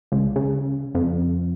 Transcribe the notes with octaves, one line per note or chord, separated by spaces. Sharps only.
C#2
C#3
F2